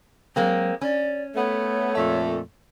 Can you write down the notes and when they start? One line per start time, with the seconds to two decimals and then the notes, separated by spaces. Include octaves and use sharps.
0.36 F#3 G#3 A#3 C4
0.81 C#4 D5
1.35 A3 B3 C#5
1.95 F2 A#2 A3